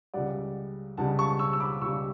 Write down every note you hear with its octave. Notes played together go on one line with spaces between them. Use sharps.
C#2 C#3 G3 D5 F#5
C#2 C#3 G3 F#5 A5
A5 C#6
C#6 E6
E6
B5 D6
C#2 C#3 G3 C#6 E6